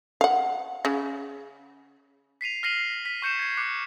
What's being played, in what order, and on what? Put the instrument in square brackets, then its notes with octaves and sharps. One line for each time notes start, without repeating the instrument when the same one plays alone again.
[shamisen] F5 F#5
C#3
[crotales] B6 C7 D#7 F7
F6 A#6 C7 D#7 F#7
B6
C#6 G6 C#7 E7
G#6 C7
D6 F#6 C#7